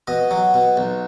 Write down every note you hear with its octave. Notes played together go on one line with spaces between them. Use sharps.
B2 D#5
F#3
B2
B1